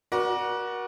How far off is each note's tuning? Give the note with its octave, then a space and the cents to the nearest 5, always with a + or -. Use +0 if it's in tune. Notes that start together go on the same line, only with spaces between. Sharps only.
F#4 +0 A#4 +40 D5 +0